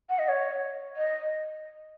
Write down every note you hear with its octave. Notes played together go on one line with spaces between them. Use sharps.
F#5
D#5
C#5
D#5